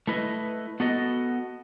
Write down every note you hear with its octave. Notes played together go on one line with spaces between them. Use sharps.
A3 E4 B4 D#5
B3 F#4 A4 D#5